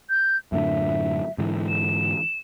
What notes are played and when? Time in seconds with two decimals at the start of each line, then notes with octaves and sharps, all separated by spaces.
0.10 G6
0.52 F#2 A2 D3 E5
1.38 G#2 D3 E3
1.69 E7